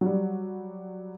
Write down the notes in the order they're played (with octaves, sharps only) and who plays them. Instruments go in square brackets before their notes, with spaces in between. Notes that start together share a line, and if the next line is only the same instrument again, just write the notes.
[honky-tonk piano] F#3 G3